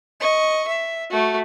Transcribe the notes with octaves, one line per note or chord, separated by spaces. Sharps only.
D#5 C#6
E5
A3 F#4